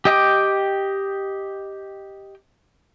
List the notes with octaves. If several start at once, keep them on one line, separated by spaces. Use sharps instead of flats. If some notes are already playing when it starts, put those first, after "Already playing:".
G4 D#5 G5 D6